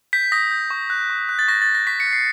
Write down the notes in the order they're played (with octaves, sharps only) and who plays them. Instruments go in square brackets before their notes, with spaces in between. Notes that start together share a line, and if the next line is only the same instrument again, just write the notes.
[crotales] G6 B6
D#6 A#6
G6
C#6
F#6
C#6
F#6
A6
C#6 A#6
A6
F#6
A#6
C#6 B6
C#7
F#6
C7